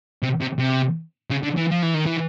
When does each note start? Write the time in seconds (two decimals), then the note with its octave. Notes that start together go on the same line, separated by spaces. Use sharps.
0.23 C3
0.40 C3
0.59 C3
1.30 C#3
1.43 D3
1.57 E3
1.71 F3
1.83 E3
1.94 D#3
2.06 E3